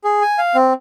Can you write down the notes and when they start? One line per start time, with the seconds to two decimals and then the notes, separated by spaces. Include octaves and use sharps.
0.04 G#4
0.22 G#5
0.38 F5
0.55 C4